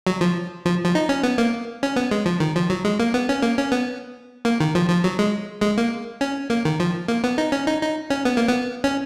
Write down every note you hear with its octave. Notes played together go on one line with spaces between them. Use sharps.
F#3
F3
F3
F3
D#4
C#4
B3
A#3
C#4
B3
G#3
F3
D#3
F3
F#3
G#3
A#3
B3
C#4
A#3
C#4
B3
A#3
D#3
F3
F3
F#3
G#3
G#3
A#3
C#4
A#3
D#3
F3
A#3
B3
D#4
C#4
D#4
D#4
C#4
B3
A#3
B3
C#4